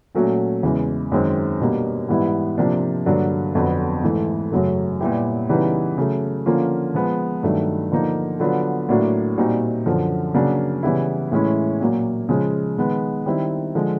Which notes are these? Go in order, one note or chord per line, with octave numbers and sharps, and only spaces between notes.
A#2 F#3 A3 C#4 F#4
E2 C#3 E3 G#3
F#2 D#3 G#3 C4
B2 G3 A#3 D4
G#2 E3 G3 B3 E4
C3 F3 A#3 D4
G2 D3 F#3 A#3 D4
F2 D3 F#3 B3
G#2 E3 A3
F#2 C#3 F#3 A3
A#2 G3 B3 E4 G4
C#3 E3 G3 B3 D#4
C#3 F#3 A3
D3 F3 A#3 C#4 F4
F3 G#3 B3
G2 D#3 F#3 A3 D4
D3 F3 A#3 D#4
D3 F#3 B3 D4 F4
A2 F#3 A#3 D4 F#4
A#2 G3 C4 D#4 F#4
F#2 D3 F3
C#3 F#3 A#3 D4 F#4
C#3 E3 G3 B3 E4
A2 E3 G#3 C#4 E4
A#2 F#3 A#3
C#3 F3 G#3
D#3 G#3 B3
D#3 G3 C4 E4
D3 F3 G#3